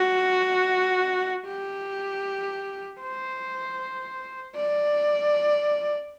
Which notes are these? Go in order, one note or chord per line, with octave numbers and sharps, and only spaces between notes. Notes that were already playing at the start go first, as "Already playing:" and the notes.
Already playing: F#4
G4
C5
D5